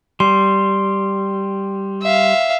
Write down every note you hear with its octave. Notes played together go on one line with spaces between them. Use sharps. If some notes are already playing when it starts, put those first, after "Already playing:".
G3 C6
E5 F5